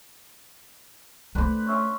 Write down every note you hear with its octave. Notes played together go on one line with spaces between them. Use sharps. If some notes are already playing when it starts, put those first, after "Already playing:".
A3 D4 B4 C5 D5
C#4 E5 C6